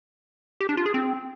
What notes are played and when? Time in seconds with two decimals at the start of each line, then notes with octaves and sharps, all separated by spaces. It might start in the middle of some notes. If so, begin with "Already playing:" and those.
0.60 G4
0.69 D4
0.77 F4
0.86 G#4
0.94 C4